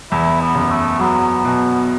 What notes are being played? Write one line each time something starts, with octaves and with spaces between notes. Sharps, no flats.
E2 E4
B3
F#1
A3
F#3 B3
B2